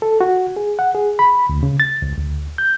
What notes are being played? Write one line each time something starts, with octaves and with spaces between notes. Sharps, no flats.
A4
F#4
G#4
F#5
G#4
B5
D2
C#3
A6
C#2
D2
G6